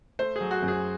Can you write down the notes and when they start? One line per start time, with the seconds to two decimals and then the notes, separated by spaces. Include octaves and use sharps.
0.19 A3 C5
0.36 F#3 G#4
0.51 F#4
0.62 F#2
0.68 G#4